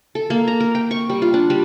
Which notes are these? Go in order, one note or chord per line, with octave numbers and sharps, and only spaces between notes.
A4
A#3
A#5
A#4
G5
C#6
G3
F4
D4
G3